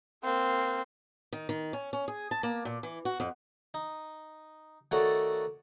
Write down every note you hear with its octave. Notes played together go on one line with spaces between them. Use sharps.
A#3 C4
D#3
D#3
C#4
C#4
G#4
A5
A#3
A#2
E3
F#4
F2
D#4
D#3 A3 F#4 A4 C#5 D5